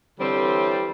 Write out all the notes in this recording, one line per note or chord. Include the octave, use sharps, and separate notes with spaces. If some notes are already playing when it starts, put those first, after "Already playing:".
D3 E3 G3 C4 C#5